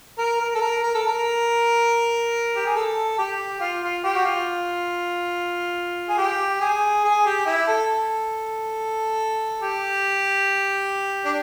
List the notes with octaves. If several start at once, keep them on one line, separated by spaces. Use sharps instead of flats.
A#4
A#4
A4
A#4
A#4
A4
A#4
G4
G#4
A4
G4
F4
F4
G4
F#4
F4
G#4
G4
G#4
G#4
G4
E4
A4
G4
D4